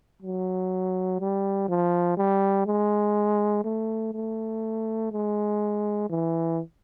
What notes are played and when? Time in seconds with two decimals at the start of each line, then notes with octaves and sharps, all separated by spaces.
0.22 F#3
1.20 G3
1.68 F3
2.17 G3
2.66 G#3
3.64 A3
4.13 A3
5.12 G#3
6.10 E3